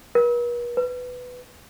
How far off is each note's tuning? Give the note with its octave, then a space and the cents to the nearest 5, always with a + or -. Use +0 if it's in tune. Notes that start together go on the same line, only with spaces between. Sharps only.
B4 -45
B4 +10